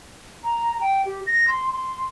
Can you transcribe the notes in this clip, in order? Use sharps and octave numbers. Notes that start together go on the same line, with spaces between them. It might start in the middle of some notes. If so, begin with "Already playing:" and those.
A#5
G5
G4
A#6
C6
C6